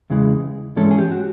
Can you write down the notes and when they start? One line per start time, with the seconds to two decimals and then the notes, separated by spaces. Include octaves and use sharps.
0.10 E2 C#3 E3 G#3
0.76 G#2 E3 G#3 C#4 A4
0.91 G#4
0.98 G4
1.11 F#4